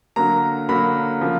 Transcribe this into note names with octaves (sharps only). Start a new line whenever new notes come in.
D3 F#3 A#3 A#5
D3 F#3 A#3 B5
C#3 F3 A#3